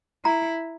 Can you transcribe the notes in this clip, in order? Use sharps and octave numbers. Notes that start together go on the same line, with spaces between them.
E4 A#5